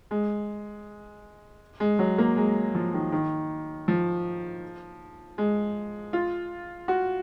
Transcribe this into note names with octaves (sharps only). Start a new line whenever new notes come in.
G#3
G#3
F#3
A#3
G#3
F3
D#3
D#3
F3
G#3
F4
F#4